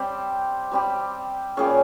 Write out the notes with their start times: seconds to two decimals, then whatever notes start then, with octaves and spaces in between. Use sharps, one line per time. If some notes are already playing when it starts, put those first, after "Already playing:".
Already playing: G3 C4 G4
0.72 G3 C4 G4
1.57 A#2 G3 C#4 G#4